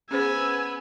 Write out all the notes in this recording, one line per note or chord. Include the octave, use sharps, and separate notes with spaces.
B3 C#4 G#4 C5 G#5 E6